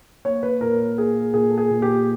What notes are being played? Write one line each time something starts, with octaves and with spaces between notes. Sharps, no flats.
A#3 C#5
B4
A#2 A#4
A#3 G#4
A#2 G#4
A4
G#4
A#2
G4